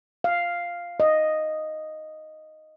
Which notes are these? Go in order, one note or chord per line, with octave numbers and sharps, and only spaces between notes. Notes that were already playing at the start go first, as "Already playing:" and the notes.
F5
D#5